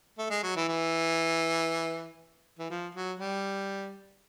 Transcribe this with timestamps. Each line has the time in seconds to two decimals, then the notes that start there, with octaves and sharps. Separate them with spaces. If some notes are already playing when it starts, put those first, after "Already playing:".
0.19 A3
0.30 G#3
0.43 F#3
0.56 E3
0.68 E3
2.59 E3
2.70 F3
2.95 F#3
3.20 G3